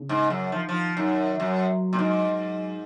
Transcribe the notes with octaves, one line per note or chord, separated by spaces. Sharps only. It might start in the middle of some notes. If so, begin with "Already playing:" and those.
Already playing: C#3
G#2
F#2
D#3 F3
F3
F#2 D#3
F#2 F#3
A#2
G#2
F#3